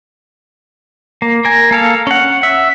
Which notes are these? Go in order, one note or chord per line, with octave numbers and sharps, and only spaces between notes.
A#3
A#4 G#5
A#3 A4 F5
C#4 F#5
E5